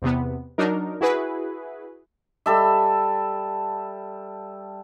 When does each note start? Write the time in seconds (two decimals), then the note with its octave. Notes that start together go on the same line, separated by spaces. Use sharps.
0.02 E2 C3 B3
0.58 F#3 D4 D#4 A#4
1.01 E4 F#4 G#4 B4
2.46 G3 A4 E5